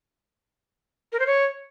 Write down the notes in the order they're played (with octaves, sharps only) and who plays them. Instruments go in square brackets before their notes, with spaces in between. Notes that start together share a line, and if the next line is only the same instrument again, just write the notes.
[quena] A#4
C5
C#5